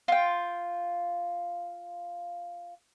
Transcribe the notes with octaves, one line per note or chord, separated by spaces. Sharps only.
F4 G5